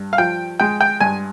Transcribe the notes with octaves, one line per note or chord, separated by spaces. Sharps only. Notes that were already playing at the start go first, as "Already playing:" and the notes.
Already playing: G2
F5
F3 G5
G#3 G5
G5
G2 G#5